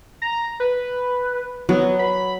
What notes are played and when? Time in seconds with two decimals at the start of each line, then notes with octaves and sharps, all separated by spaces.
0.22 A#5
0.60 B4
1.69 F#3 B3
1.99 B5